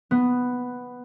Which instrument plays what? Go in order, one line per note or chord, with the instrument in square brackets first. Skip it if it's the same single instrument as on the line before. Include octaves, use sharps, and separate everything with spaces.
[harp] B3